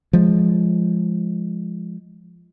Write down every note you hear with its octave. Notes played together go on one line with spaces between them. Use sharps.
F3 G#3